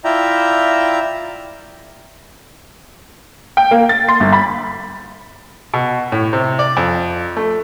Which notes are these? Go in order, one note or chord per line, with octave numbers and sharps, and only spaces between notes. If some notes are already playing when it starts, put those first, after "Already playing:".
E4 F4 D5 E5 G5 A#5
G5
A#3
A6
C6
G1
B5
B2
A2
C3
D5
F2
A3